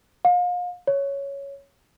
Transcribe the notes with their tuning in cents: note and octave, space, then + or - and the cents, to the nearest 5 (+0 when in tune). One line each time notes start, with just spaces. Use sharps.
F5 +35
C#5 +5